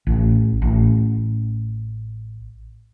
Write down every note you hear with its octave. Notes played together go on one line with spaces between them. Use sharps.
A1
A1